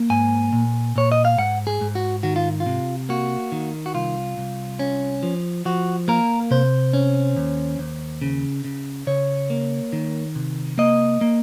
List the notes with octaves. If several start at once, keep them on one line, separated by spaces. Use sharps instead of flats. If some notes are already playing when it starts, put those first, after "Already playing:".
Already playing: A#3
G#2 G#5
A#2
A#2 C#5
D#5
F5
G#2 F#5
G#4
G#2
F#4
D#3 F#4
F4
F4
C3
A#3 F#4
D#3
F#4
C2 F4
C2
C#4
F3
F3 F#4
A#3 A#4
C3 C5
C#4
D#2
D#2
C#3
C#3
C#3 C#5
A#3
D#3
C3
A#3 D#5
A#3